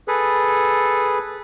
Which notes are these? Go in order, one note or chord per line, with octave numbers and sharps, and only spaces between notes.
G#4 A4 B4